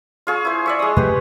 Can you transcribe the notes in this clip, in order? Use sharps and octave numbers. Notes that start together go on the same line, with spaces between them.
F4 G#4 C#6
E4 C5
D5 E5 C#6
G#3 D#6
F2 C3 A3 G4 B4